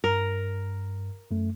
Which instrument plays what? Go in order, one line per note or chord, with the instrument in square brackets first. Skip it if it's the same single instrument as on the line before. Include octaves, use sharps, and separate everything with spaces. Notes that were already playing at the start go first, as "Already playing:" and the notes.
[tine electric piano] G2 [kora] A#4
[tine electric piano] F#2 A3